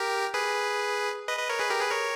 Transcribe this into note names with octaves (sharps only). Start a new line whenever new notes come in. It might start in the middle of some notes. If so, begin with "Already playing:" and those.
Already playing: G4 A#4
G#4 B4
B4 D#5
B4 D#5
A#4 C#5
G#4 B4
G4 A#4
G#4 B4
A#4 C#5